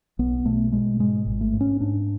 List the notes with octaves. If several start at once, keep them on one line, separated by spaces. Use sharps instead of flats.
B1 B3
B2 A3
B2 G#3
G#2 G#3
G#1
A3
G#2
C#4
G#2 D4